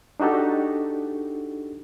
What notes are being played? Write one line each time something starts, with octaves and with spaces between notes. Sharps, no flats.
D4 D#4 F#4 G4 A4